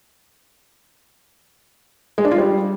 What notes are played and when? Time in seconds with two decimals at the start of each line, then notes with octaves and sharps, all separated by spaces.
2.18 G#3
2.25 D4
2.31 F4
2.38 G3